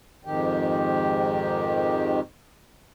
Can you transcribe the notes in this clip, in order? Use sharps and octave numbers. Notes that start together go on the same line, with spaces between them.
F2 G#2 D#3 G4